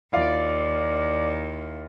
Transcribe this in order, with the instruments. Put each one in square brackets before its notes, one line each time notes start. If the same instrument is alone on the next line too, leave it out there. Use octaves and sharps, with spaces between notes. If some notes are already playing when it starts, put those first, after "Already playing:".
[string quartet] D#2 [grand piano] E4 F4 F5 [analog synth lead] D5